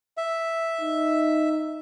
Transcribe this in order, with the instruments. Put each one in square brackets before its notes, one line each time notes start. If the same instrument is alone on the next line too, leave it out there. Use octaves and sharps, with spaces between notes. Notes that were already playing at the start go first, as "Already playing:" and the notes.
[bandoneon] E5
[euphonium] D#4